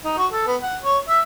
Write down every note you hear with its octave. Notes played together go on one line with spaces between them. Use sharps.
D#4
F#4
A4
B3
F#5
C#5
E5